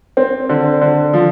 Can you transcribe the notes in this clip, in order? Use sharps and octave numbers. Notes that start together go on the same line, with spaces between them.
C4
D3
D3
F3